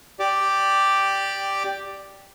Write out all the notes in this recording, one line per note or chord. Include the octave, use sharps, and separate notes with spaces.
G4 D5